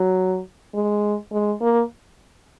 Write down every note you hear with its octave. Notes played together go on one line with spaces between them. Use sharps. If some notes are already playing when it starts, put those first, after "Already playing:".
Already playing: F#3
G#3
G#3
A#3